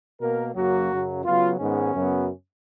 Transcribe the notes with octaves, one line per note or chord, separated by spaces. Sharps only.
B2 A#3 A#4
F#2 C#3 F#3 A#3 F#4
F#2 C#3 F#3
C#3 F#3 B3 F4
G#2 D#3 G#3 B3 C#4
F#2 C#3 F#3 B3